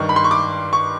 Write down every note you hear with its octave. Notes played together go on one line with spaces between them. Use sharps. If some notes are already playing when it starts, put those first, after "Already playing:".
Already playing: G2 D#3 C#6
B5
C6
C#6
D6
C#6